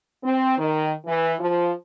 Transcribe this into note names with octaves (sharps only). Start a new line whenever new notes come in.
C4
D#3
E3
F3